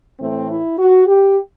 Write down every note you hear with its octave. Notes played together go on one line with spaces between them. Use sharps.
A2 E3 A3 C4
E4
F#4
G4